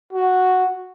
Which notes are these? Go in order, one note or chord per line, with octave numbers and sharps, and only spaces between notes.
F#4